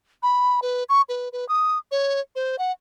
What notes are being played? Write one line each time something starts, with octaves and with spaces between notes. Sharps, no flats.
B5
B4
C#6
B4
B4
D#6
C#5
C5
F#5